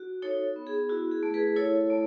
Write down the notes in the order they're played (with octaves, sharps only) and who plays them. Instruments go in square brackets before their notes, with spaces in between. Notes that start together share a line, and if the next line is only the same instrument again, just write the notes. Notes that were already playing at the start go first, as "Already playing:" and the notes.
Already playing: [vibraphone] F#4
D#4 A4 C#5
B3
G#4
E4 F#4
G#4
A3
G#4 B4
E4 A4 C#5
A3